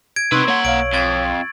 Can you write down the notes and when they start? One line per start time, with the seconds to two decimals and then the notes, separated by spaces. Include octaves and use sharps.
0.16 G#6 D7
0.32 C3 C4 D#4 B4 C6 C#6 E6 F#6
0.48 A#3 C#5 F#5 G#6 F#7
0.65 B1 C#5 F5 D7
0.94 F2 G#6 A6